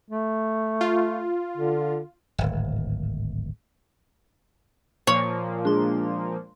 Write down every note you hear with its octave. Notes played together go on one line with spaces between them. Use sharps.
A3
F4
D3
D1 G#1
A#2 F3 A#3 C#5
G#3 D4 C6